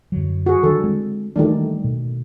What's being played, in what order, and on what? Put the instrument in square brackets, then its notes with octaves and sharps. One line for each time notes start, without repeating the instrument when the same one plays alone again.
[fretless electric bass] F#2 D3 F#3
[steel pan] F#4 G#4
[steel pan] D3 A4 [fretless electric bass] D#3 F#3 G3
[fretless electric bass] G#3 C4
[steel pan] D#3 A3 D4 [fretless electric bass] E3 G3
[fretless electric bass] B2